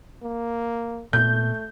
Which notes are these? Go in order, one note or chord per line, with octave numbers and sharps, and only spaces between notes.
A#3
A#2 A3 B3 G6